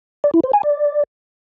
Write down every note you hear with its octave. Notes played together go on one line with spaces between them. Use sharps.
D5
E4
C5
G#5
D5